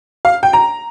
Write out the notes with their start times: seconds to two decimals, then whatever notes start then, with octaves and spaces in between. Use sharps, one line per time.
0.25 F5
0.43 G5
0.53 A#5